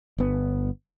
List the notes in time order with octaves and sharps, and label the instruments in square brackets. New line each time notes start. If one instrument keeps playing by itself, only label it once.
[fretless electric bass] G1 B3